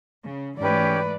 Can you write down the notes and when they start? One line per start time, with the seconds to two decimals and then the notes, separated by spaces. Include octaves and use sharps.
0.24 C#3
0.58 G#2 E3 A3 C#4 G4 B4 D5